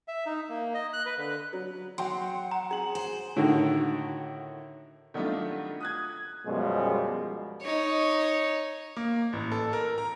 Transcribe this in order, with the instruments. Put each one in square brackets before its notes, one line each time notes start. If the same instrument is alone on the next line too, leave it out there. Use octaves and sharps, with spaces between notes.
[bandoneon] E5
D#4
A#3
D#5
F#6
B4
D3
[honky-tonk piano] F#3
[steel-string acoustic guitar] F#3 [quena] F#5 [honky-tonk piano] G5 C6
[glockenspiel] A#5
[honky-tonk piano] G#4 F#7
[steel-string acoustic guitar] C5
[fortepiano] A2 D3 D#3 F#4
[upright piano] D#3 F#3 G3 A3 D4 F4
D#6 F#6 G#6
[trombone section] F#2 B2 F3 G3 G#3
[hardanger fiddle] D#4 C#5
[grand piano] A#3
A1
A4
A#4
A#5